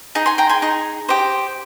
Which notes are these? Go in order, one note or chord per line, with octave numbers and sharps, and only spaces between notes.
D#4 G#4
G#5 C6
G5 A#5
G#5 C6
D#4 G#4
G4 C5 D#5